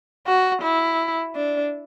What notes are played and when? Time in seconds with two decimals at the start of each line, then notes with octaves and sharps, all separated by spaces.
0.27 F#4
0.62 E4
1.35 D4